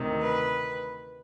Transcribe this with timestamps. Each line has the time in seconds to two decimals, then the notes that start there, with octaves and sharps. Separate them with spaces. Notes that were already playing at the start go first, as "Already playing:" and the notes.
Already playing: D2 C3 D#3
0.20 B4